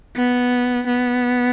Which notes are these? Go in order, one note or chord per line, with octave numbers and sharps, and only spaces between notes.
B3
B3